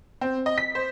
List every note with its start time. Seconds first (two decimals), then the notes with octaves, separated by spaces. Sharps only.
0.21 C4
0.46 D#5
0.58 B6
0.75 C5